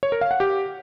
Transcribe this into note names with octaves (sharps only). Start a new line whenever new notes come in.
C#5
A#4
F5
F#5
G4